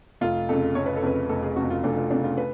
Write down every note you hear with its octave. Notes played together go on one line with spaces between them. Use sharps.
F1 F4
F2 C#3 A4
F1 C#5
B4
A4
F2 C#3 B4
F1 A4
G#4
F2 C#3 F#4
F4
F1 D4
F4
F2 C#3 D4
F4
B4